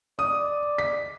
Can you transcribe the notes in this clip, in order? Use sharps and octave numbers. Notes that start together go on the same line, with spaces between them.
D5 D#6
B6